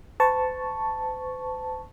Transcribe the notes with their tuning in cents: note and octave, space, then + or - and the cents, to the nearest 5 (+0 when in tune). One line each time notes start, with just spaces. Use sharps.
C5 -45 A5 +0 C#6 +0